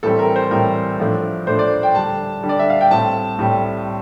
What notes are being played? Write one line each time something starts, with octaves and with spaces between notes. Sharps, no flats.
A2 E3 G3 C4 A4
A#4
C5
A2 E3 G3 C4 A#4
A2 F3 A3 D4
A2 F3 A3 D4 C5
D5
G5
D3 G3 D4 A5
D3 G3 D4
D5
E5
F5
G5
A2 G3 C4 A5
A2 G3 C4